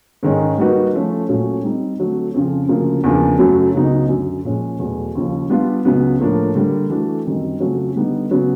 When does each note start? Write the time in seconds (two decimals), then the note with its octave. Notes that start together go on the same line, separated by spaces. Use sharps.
0.23 G#2 D#3 G#3 C#4
0.58 G3 A#3 D#4 F#4 B4
0.93 F3 A3 C#4
1.28 A#2 F#3 A3 C#4
1.63 G3 C4 D#4
1.99 D3 F#3 A3 C4
2.34 F2 C#3 F3
2.68 D2 C#3 F3 A#3
3.04 E2 C#3 F3 A#3 D4
3.39 F#2 C#3 F#3 A3
3.74 C#2 C#3 F#3 B3 D#4
4.09 F#2 D3 F#3
4.45 A#2 F3 G#3 C#4
4.79 E2 B2 F#3 A3
5.15 D#2 C#3 F3
5.50 G3 B3 D4 F4
5.85 C#2 C#3 F#3 B3
6.20 A2 F3 A#3 D4
6.55 D3 G3 A#3
6.90 E3 A3 D4 F#4
7.25 F#2 D#3 G3 C4
7.60 F2 C#3 F#3 A3 C#4
7.96 D3 G3 B3 D#4
8.31 C#3 F#3 B3